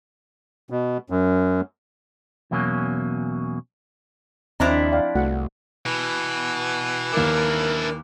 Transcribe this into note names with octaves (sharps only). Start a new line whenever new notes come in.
B2
F#2
E2 B2 F#3 A#3 C#4
D#2 F3 C4 D4 E4 D#5 A#5
D5 F5 G5
C2 A3 F#4 F#5
B2 E3
D#2 D4 E4 A#4 D6